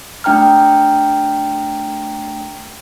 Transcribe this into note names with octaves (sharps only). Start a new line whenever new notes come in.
A3 D4 G5 A#5 F6